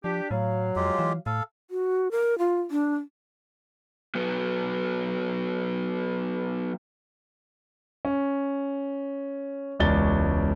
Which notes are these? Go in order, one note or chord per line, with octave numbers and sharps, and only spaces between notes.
F3 D4 G4
A2 F#3 F5
F2 G#3 F4 G4
E3
A2 A4 F5
F#4
A#4
F4
D4
F#3 B3
C#4
E1 C#2 C#4 D5 A6 G7